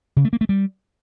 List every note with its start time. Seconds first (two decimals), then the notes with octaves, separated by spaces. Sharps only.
0.17 C#3
0.25 A3
0.33 A#3
0.41 A3
0.49 G3